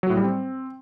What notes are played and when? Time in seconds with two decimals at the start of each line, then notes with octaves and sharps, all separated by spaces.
0.03 F#3
0.10 A2
0.17 G3
0.24 C4